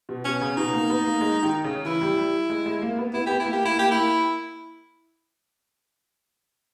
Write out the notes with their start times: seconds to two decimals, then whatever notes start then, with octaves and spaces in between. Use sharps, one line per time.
0.09 B2
0.25 B2 C#4
0.41 C#3
0.57 B2 D#4
0.73 A#3
0.90 B3
1.05 A#3
1.21 G#3
1.43 D#3
1.64 C#3
1.85 E3 E4
2.01 G3
2.17 G3
2.50 G#3
2.66 G#3
2.82 A#3
2.99 B3
3.13 B3 E4
3.26 B3 G4
3.40 E4
3.46 A#3
3.53 G4
3.62 A#3 E4
3.78 A#3 G4
3.91 A#3 E4